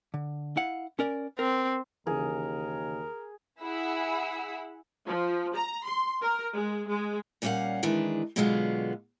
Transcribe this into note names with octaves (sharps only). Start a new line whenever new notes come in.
D3
E4 F5 F#5
C#4 A#4 D5
C4 A#4
D#2 C#3 E3 G#4 A#4
E4 G#4 F#5 B5 E6
F3
A#5
C6
A#4
G#3
G#3
A#2 G3 C#4 C#5 F5 F#5
D#3 E3 G#3 D4 B4
B2 D3 F#3 G#3 B3 F4